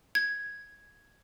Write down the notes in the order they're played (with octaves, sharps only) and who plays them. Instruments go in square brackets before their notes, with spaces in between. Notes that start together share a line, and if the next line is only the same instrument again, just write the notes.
[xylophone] G#6